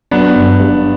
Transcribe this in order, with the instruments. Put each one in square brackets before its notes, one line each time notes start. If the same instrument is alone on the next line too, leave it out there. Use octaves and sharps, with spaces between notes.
[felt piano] F#3 [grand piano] B3 D4
[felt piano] G1
G2